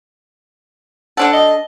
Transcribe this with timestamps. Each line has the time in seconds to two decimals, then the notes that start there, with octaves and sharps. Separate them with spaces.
1.17 D3 D4 A4 F#5
1.33 D#5